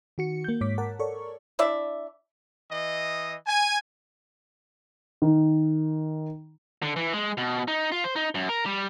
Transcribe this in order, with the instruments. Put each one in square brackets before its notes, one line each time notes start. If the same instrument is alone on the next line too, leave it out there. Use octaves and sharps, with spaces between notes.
[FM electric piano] D#3 F#4 C#7
A#3 G6
G#2 C#5 D6 B6
A#4 F#5 A5
A4 A#4 C#5 D5 C#6
[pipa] D4 E4 D5 E5
[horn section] E3 D#5
G#5
[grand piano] D#3
[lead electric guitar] D3
E3
G#3
B2
D#4
F4
C5
D#4
F#2
A#4
G3